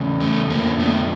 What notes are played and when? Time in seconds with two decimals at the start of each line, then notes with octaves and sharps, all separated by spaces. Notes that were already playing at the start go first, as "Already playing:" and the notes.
Already playing: E2 C#3
0.20 A3
0.50 F2 D3 F3 A#3
0.79 A3 B3